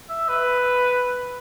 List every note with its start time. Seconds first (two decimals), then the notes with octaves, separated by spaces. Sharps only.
0.10 E5
0.29 B4